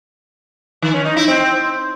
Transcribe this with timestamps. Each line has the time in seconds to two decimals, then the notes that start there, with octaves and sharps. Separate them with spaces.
0.82 D#3
0.94 C#4
1.05 D#4
1.17 E4
1.28 C4